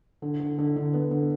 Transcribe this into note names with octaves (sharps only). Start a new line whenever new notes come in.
D3
D3
D3
D3
B3
D3